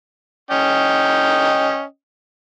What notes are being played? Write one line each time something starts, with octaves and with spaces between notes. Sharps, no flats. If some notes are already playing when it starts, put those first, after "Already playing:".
C#4 D#5 G5